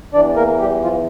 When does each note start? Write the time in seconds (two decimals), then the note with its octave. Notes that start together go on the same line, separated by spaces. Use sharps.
0.14 E2 E3 D4 D5
0.36 A#3 A#4
0.60 G3 G4
0.83 F3 F4